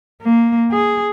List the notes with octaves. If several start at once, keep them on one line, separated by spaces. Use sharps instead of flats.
A#3
G#4